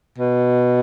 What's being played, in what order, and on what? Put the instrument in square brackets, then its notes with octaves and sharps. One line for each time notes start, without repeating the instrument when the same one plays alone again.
[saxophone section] B2